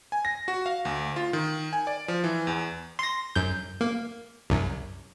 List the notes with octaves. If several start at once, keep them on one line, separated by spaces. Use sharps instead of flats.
G#5
A#6
F#4
F5
D2
F4
D#3
G#5
D5
F3
E3
E2
C6 A#6
F#2 G6
A#3
C2 F#2